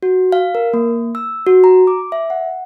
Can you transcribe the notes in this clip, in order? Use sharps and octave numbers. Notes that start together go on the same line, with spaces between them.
F#4
F5
A#4
A#3
E6
F#4
A#5
D6
E5
F#5